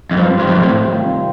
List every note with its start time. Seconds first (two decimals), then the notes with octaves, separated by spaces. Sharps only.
0.11 F2
0.17 G2 F3 C4 F4 C5
0.39 G2
0.47 F2
0.55 G2
0.63 A2
0.85 C3 D#3 G3 C4 F4